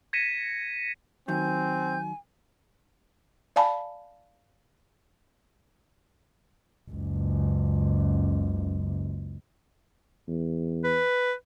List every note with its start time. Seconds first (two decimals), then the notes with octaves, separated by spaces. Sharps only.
0.13 G#6 A#6 B6 C#7 D#7 E7
1.28 D#3 F#3 C4 G#5 G6
3.56 D5 F5 G#5 A5 B5
6.91 F#1 C#2
10.28 E2
10.84 B4